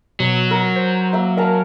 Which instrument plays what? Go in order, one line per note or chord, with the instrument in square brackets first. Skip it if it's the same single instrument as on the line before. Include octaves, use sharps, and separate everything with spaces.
[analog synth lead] B2 [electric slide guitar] F#3
[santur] A#4
[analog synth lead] C5
[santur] A#3 E5
[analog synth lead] A#4 [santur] F5 G#5 A5